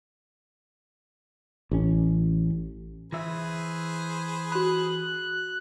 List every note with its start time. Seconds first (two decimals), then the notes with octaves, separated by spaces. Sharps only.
1.71 A1 C#4
3.12 E3 G#4 B4 C5 E5
4.52 F#4 B5 F#6